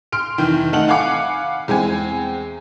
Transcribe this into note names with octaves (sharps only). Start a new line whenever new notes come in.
C6 F6 D7
F1 D#3 E3
A3 D#4 A4 F#5 F7 F#7
F5 F#5 G#5 B5 D6 C#7
E2 G#3 C4 G#5